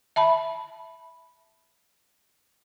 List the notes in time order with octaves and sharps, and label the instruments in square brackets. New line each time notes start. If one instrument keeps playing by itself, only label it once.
[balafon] E5 A5 B5